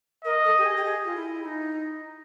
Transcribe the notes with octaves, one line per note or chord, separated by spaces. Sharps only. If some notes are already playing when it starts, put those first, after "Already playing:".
A#4 D#5
A4
G4
G#4
G4
G#4
F4
E4
E4
D#4